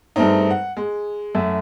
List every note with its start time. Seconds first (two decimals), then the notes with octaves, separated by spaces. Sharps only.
0.16 G2 G#3 A3 C4 D#4
0.50 F#5
0.77 G#3
1.35 F#2 A3 E5